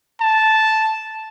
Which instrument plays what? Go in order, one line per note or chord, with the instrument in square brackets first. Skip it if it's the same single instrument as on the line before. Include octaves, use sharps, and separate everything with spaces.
[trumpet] A5